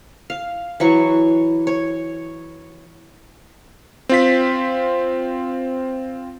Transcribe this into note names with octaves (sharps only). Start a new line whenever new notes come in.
F5
E3 F#3 C#6
C#5
C4 F4 B6